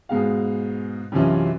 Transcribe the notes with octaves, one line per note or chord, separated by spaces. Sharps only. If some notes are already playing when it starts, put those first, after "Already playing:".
G#2 B2 G#3 F5
B1 F#2 C3 E3 C#4 F4